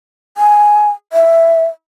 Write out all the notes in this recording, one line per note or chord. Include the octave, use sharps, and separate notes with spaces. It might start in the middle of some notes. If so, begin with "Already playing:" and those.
G#5
E5